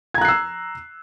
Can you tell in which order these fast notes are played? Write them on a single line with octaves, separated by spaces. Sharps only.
G#6 A#5 F#6 C7 E6